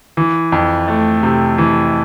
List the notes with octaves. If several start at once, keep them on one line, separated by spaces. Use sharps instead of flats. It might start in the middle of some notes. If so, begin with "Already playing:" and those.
E3
F2
A3
C3
E3